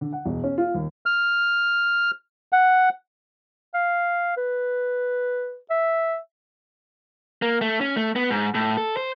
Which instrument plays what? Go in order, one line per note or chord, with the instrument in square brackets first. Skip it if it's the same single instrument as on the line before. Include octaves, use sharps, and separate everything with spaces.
[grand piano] D3
F#5
E1
C#4
F4
D#2
[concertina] F6
F#5
[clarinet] F5
B4
E5
[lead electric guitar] A#3
A3
C#4
A3
B3
G#2
A2
A4
C5